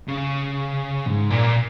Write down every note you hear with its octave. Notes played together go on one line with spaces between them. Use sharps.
C#3
G#2
A#2